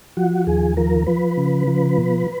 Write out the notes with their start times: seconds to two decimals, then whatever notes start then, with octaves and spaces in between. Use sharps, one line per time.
0.17 F3 F#4
0.47 D#2 G#4
0.77 F3 A#4
1.07 F3 B4
1.37 C#3
1.67 F3
1.98 B2